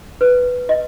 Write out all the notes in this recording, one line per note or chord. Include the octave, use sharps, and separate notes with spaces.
B4
D#5